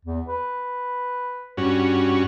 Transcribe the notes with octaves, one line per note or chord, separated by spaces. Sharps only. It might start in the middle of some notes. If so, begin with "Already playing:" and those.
E2
B4
G2 C#4 F#4